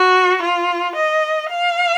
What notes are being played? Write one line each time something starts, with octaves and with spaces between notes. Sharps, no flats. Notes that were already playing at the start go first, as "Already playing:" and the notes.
Already playing: F#4
F4
D#5
F5